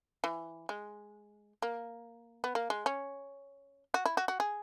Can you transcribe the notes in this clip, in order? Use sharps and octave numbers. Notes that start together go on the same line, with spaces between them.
E3
G#3
A#3
B3
A#3
G#3
C#4
F#4
E4
F#4
F#4
G#4